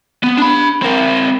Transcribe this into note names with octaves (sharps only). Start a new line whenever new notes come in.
B3
D4 B5
C4 A#4